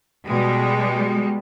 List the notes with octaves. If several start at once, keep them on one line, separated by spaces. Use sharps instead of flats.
B2 G3 G#3